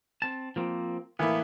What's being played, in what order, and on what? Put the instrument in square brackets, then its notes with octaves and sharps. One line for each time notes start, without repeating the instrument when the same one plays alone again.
[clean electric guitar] C4 A5
F3 A#3 C4
[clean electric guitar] A2 B3 [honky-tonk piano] E3 A#3 E4